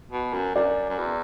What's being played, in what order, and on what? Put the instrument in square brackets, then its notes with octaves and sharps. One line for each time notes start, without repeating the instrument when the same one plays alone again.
[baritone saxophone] B2
F#2
[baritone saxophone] F#2 [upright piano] D5
[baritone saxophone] F#2
E2